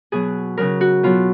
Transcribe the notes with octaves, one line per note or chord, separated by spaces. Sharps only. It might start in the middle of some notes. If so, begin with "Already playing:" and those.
B2 F#3 G#4
C#3 F#3 A#4
F#4
B2 F#3 F4